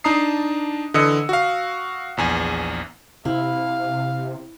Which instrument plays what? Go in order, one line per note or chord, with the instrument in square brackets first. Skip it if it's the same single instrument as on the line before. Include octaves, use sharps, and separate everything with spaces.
[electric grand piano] D4 D#4 A5 A#5 D#6 C7
D3 E3 D#5 D#6 E6 C#7
F#4 F5
A#1 E2 G#5
[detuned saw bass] C3 [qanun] E4 [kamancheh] F5